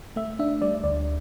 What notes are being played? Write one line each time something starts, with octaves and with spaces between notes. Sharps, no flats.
A3 E5
D4 E5
G3 D5
D2 D5